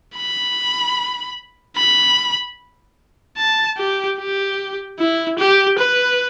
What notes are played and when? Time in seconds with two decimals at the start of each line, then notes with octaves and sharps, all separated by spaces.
0.16 B5
1.77 B5
3.37 A5
3.78 G4
4.19 G4
4.99 E4
5.39 G4
5.79 B4